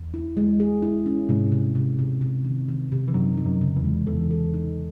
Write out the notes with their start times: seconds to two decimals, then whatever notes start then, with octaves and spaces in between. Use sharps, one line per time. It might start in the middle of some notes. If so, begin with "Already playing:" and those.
Already playing: E2
0.14 E4
0.37 G#3
0.60 G#4
0.82 E4
1.06 C#4
1.29 G#2 C3 G#3
1.52 C3
1.75 C3
1.99 C3
2.21 C3
2.45 D#3
2.68 D#3
2.92 C3
3.08 E3
3.14 F#2 F#3 D#4
3.37 D#4
3.45 F#2 F#3
3.61 C#3
3.76 E2 E3
3.84 G#3
4.07 E2 E3 A4
4.31 A4
4.54 D#4